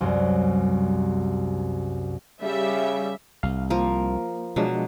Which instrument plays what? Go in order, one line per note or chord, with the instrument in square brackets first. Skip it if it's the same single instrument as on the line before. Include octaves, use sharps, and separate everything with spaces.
[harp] C2 F#2
[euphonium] C#3 [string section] G3 E5
[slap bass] C2 [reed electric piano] F5
[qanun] F3 A#4 [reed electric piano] A#3
[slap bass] B2 [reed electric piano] F3 G#3 D4 [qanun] F#3